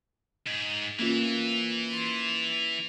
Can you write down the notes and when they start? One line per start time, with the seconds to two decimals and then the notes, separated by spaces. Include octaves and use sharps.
0.47 G#2
0.99 E3 A#3 C#4 F4
1.91 C6 A6 C7